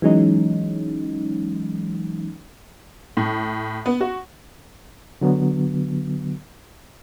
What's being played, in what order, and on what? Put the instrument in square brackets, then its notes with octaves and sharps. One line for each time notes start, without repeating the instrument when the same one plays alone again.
[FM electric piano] E3 F#3 G#3 C#4 D#4
[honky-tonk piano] A2
B3
F#4
[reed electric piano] D3 F#3 B3